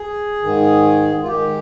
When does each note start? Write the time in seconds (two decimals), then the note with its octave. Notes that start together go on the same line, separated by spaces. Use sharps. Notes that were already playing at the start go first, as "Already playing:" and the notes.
Already playing: G#4
0.43 G#2 D#3
1.22 F4
1.28 G#2 D#3 G4